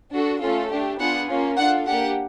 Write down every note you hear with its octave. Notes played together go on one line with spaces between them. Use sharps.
D4 F#4 A4
A3 C#4 F4 A4
A3 D4 G4
B3 D4 F4 G#4 F#5
A#3 C#4 F4
D4 F4 A4 F#5
A#3 D4 G4 F#5